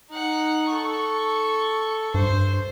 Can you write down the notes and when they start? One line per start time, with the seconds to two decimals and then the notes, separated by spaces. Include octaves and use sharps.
0.11 D#4 F#5
0.70 A4 C#6
2.14 G2 C5